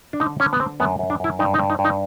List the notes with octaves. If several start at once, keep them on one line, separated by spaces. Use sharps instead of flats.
D4
D3 D#4
D3 C#4
B3
D3 C4
F#2 B3
F#2
D4
F#2 E4
G2 D#4
D#4
G2
D#4
G2
D#4